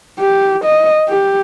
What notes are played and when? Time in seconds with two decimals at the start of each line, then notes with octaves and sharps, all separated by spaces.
0.20 G4
0.64 D#5
1.09 G4